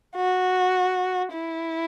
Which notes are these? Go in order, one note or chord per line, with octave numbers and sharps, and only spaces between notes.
F#4
E4